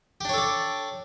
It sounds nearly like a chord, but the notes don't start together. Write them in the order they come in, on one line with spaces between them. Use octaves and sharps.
G4 D4 C#5 A4 D5